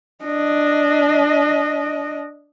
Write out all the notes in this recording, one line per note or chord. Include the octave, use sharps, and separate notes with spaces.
D4 D#5